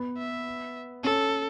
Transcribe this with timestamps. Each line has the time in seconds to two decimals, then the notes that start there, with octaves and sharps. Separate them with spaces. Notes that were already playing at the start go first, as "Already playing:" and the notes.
Already playing: B3
0.18 E5
1.04 C#4 A4